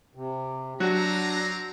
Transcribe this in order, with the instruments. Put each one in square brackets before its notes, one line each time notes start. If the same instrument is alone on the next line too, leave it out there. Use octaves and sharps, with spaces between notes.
[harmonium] C3
[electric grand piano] F#3 [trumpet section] C4 A#5 [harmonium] D4 [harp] F#4